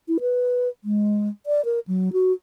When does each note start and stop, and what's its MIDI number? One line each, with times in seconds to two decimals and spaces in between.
0.08 0.18 64
0.21 0.68 71
0.84 1.28 56
1.46 1.64 74
1.65 1.80 70
1.87 2.12 54
2.13 2.32 66